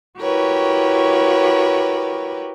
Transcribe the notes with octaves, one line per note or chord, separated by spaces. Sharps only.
E4 F#4 G4 A#4 B4 C#5